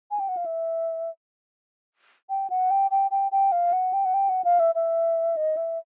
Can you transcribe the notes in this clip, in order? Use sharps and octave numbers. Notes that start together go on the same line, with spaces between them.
G#5
G5
F#5
F5
E5
G5
F#5
G5
G5
G5
G5
F5
F#5
G5
F#5
G5
F#5
F5
E5
E5
D#5
E5